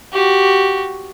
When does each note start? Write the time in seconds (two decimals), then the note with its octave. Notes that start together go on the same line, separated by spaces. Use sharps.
0.13 F#4 G4